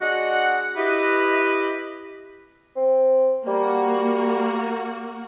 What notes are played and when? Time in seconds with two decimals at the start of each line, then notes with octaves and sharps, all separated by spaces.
0.01 G#3 D4 F#4 D#5 F#5
0.77 E4 G4 B4 D#5
2.76 C4
3.47 G3 A#3 F#4